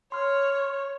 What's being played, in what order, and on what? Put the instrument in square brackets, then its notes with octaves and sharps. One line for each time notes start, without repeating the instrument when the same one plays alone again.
[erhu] C#5 [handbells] C6 F6